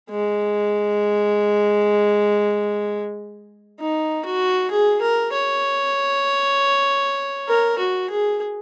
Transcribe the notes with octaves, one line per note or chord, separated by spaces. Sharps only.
G#3
D#4
F#4
G#4
A#4
C#5
A#4
F#4
G#4